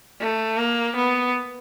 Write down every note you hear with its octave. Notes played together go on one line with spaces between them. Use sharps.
A3
A#3
B3